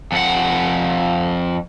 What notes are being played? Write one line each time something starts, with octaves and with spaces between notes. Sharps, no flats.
F2 F#5